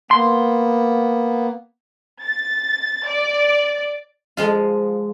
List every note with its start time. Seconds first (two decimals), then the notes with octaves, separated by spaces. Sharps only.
0.11 A#3 B3 C6
2.22 A6
3.07 D5
4.37 F3 G#3 F4